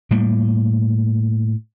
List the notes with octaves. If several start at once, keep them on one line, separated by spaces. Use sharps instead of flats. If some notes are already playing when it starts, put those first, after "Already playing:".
A2 G3 A#3